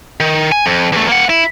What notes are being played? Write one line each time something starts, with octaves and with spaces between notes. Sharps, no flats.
D#3
G#5
F2
E2 A3
A#3 F#5
E4